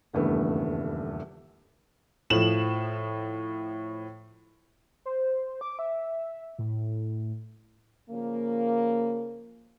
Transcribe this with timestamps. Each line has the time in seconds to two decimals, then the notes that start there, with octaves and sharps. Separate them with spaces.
0.13 D#1 E2 G2 C#3 A3 B4
2.30 A2 F3 E7 F#7
5.05 C5
5.61 D6
5.79 E5
6.59 A2
8.10 C#3 F3 A#3